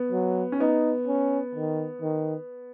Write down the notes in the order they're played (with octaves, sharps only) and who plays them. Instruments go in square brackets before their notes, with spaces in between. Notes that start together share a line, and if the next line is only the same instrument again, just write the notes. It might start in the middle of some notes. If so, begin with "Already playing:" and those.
Already playing: [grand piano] B3
[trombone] F#3
[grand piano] C#4
[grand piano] B3 [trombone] D#4
[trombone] C#4
D#3
D#3